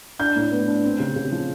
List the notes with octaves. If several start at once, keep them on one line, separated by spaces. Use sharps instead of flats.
D4 G6
A2
B3
D4
C4
C#3
C#3
F3